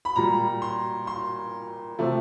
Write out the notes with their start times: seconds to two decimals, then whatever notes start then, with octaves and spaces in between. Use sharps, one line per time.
0.05 B5
0.16 A#2 G3 A#5
0.62 C6
1.07 C6
1.99 C3 F3 A3